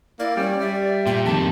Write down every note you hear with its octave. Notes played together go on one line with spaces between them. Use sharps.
A#3 E4 D5
G3 C#4
G3 E5
A#2 G5
F2 D#3 A5